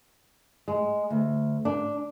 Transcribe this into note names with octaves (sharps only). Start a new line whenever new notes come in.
G#3
D2
D4